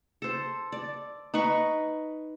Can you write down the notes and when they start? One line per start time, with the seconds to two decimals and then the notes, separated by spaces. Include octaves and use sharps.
0.22 A4 C5
0.72 D5
1.34 D#4 B4 B5 C#6